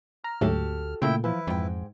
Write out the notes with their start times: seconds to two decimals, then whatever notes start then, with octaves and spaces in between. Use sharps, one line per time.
0.24 A#5 F6
0.41 D2 G#2 F#3 A3 F#4 G4 A4
1.02 A#2 C#3 A3 E4 G5
1.24 E3 F3 E4 B4
1.47 F2 G#2 G5